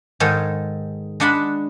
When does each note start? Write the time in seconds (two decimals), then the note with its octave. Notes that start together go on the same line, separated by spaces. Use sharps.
0.20 G#2 D#3 G#3 A4
1.20 G#3 D4 F#5 A5 B5